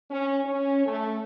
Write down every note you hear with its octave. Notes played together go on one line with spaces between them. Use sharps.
C#4
C#4
A3